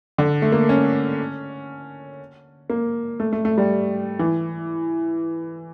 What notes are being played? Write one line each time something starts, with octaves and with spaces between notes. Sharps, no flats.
D3
A3
A#3
C#4
A#3
A3
A3
A3
G3
E3